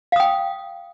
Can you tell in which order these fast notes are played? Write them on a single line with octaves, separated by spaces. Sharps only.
F5 D#6 G5